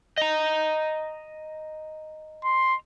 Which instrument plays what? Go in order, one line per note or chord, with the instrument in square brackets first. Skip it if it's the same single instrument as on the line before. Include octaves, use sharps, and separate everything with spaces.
[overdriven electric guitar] D#5 A#5
[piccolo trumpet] C6